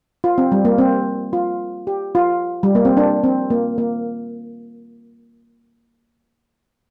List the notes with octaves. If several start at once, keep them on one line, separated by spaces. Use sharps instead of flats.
F4
C4
G3
A#3
C4
F4
G4
F4
G3
A#3
C4
D4
C4
A#3
A#3